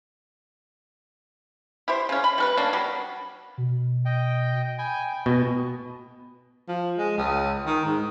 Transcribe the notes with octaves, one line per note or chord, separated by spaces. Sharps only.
E4 G4 C5
C#3 C#4
B5
G3 A#4 B4
A#3 B3 C#4 D4
F#3 G3
B2
D#5 G5
G5 G#5 B5
B2 D#5
F3
G#3
C#2
D#3
G#2